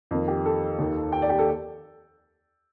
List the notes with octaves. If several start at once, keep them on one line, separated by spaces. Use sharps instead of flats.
F2 D#3 A#3
G4
A4
D#2 D#3 A#3
G5
D5
G4
A4